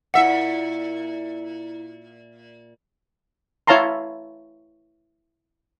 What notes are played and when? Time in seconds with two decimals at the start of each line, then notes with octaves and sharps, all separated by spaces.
0.14 A#2 E4 E5 F#5 C#7
3.67 E4 C#5 F5 A5 A#5 C6